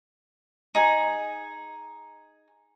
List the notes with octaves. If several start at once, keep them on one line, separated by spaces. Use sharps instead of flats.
D#4 G#4